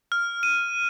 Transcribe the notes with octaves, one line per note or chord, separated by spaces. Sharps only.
F6
D#7